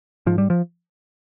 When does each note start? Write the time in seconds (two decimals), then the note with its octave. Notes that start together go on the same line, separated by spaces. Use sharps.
0.26 G#2 F3
0.38 G3
0.50 F3